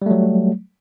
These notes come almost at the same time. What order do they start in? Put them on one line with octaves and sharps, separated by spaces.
G3 A3 F#3